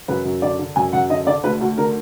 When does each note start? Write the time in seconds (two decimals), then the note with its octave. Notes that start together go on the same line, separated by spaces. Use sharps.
0.08 F#2 B4
0.25 F#2
0.42 D3 D5
0.59 D3
0.76 F#2 G#5
0.92 F#2 F#5
1.10 D3 D#5
1.27 D3 D5
1.44 D2 B4
1.61 D2 F#4
1.78 D3 A#4